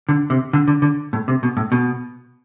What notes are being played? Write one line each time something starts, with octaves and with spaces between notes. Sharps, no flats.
D3
C3
D3
D3
D3
A2
C3
B2
A2
B2